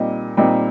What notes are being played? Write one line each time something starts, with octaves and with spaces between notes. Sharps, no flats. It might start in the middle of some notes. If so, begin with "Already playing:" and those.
Already playing: A#2 G3 C4 D#4 D#5
A#2 G3 C4 D#4